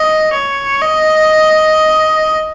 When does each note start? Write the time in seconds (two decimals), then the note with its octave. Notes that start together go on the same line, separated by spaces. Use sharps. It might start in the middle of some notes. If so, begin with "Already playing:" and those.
Already playing: D#5
0.33 C#5
0.82 D#5